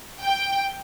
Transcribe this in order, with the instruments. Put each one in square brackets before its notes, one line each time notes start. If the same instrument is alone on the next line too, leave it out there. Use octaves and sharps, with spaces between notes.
[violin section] G5